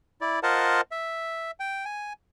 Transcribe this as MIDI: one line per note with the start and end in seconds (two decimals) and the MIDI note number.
0.21 0.40 64
0.21 0.40 74
0.43 0.81 65
0.43 0.81 70
0.43 0.81 72
0.43 0.81 75
0.43 0.81 78
0.43 0.81 81
0.91 1.51 76
1.60 1.85 79
1.85 2.13 80